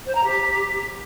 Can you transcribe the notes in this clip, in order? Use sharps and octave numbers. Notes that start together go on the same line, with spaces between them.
C5
A#5
G4